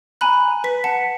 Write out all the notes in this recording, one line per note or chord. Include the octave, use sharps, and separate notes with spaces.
G#5 A#5 B5 F#6
B4 B6
F#5 A5 B6 C#7